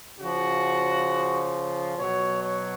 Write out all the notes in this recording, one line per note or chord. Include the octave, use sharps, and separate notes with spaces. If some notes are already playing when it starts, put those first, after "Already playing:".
C#3 F3 F#4
B2 F#3 C#5
C#5